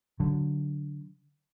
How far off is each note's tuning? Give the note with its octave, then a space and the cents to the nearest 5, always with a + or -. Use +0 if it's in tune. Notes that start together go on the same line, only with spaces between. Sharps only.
D3 -10 F#3 +0